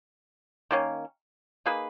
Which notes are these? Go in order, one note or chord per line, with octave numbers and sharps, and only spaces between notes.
D#3 A#3 C#4
A#3 D#4 G#4 B4